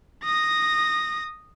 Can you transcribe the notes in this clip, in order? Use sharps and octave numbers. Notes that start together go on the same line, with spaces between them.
D#6 A#6